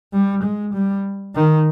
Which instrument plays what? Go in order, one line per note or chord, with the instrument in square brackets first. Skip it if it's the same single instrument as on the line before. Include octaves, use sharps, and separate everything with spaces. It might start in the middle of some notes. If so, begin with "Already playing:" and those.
[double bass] G3
G#3
G3
D#3